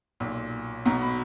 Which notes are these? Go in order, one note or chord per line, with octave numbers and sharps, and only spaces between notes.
B1 A#2
B1 B2 A#5
B5